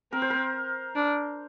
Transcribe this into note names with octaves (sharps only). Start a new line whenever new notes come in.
C4 A#4
C5
A#4
D4